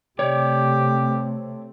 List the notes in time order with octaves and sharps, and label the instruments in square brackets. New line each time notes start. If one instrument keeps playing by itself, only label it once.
[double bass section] C3 A3 C4 [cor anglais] G4 [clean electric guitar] C#5 D5